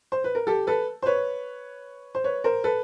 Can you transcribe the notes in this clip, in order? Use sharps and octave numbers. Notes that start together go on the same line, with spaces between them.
C5
B4
A#4
G4 A4
A4 B4
C5
B4 C#5
C5
B4 C#5
A#4 C5
A4 B4